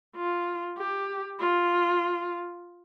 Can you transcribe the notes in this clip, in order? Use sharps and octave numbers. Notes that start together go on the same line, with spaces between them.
F4
G4
F4